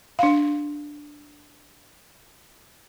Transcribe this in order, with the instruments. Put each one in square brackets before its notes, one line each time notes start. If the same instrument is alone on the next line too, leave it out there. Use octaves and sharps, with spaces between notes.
[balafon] D4 F5